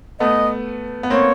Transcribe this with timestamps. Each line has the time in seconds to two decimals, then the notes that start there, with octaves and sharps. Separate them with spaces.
0.20 A3 B3 D#5
1.03 B3
1.10 A#3 C4 C#5